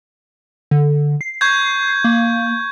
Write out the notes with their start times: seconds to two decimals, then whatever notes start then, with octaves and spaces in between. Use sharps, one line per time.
0.71 D3
1.21 C7
1.41 C#6 G6 G#6
2.04 A#3